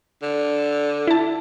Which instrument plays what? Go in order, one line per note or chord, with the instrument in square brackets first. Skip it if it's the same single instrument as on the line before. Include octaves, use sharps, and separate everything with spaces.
[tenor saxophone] D3
[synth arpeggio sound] E4 A5